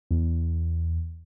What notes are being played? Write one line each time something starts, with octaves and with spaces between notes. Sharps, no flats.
E2